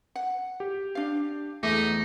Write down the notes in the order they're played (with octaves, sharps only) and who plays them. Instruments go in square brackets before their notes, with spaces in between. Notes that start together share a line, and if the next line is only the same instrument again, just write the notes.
[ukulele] F#5
[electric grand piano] G4
[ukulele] D4 F5
[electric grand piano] E2 A3 D6 [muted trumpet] D#4 [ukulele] E5